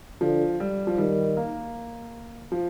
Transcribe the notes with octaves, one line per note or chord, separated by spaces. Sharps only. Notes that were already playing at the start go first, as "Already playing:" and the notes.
D3 F3
G3
F3
D#3 G3
A#3
F3